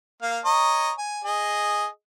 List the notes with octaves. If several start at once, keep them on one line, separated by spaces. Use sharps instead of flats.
A#3 F5
C#5 D#5 A#5
G#5
G#4 D#5